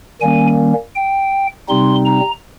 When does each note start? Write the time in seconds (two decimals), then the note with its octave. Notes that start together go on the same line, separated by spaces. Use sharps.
0.21 D#3 G3 A#3 C#4 G#5
0.95 G5
1.69 C3 G3 C4 D#4 C6
2.06 A#5